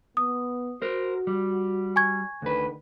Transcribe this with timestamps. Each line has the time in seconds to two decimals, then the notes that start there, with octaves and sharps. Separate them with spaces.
0.17 B3 D#6
0.82 F#4 A#4 C5
1.27 G3
1.96 G#5 C#6 G#6
2.42 D2 D3 D#3 B4